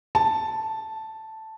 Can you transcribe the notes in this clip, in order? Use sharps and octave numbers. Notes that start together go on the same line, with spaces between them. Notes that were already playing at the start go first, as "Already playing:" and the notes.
A5